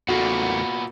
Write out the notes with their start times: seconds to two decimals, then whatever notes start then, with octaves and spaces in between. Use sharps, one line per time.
0.08 E2 A#2 A3 B3 F#4